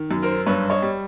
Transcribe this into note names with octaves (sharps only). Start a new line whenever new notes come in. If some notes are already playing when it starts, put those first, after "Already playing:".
Already playing: D#3
F#2
A#4 C5
G2 B4 C#5
C#5 D#5
G3